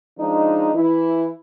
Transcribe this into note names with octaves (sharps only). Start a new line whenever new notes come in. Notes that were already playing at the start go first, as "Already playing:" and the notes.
F3 G#3 D4 D#4
E3 E4